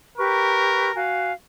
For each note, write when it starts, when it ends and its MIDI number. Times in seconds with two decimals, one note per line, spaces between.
0.18 0.91 67
0.18 0.99 70
0.18 0.91 71
0.18 0.91 85
0.95 1.32 66
0.95 1.32 77
0.95 1.32 80